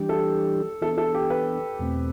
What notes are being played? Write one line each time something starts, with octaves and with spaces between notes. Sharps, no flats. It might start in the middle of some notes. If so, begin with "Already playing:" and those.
Already playing: E3 G3 D4 G4
A4
E3 B3 D4 A4
A4
G4
B4
E2 B2 A3 C4